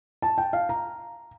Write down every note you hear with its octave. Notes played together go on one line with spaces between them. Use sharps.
A5
G5
F5
A#5